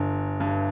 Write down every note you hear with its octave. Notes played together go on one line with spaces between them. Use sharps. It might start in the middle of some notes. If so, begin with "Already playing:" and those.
Already playing: G1 D3
G2